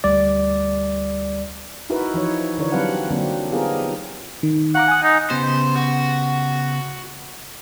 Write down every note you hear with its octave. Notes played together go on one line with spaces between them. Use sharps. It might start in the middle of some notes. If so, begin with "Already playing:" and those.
D2 G3 D5
D#4 E4 F#4 A#4 B4
E3 F3 D#4 C#5
D3 E3 D4 A#4 C#5
F#3 G3 C4 B4 F5 F#5
D3 F#3 A#3 C4 D4
B3 D#4 F4 G4 G#4 A#4
D#3
F5 F#5 A#5 D6
G#5 D#6
D#4
C#3 B3 G4 C5
F#4